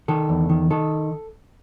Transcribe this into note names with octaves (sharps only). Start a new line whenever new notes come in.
D#3 A4
E2
D#3
D#3 A4